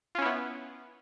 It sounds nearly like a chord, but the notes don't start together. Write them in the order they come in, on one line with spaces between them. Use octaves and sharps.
F4 C#4 E4 B3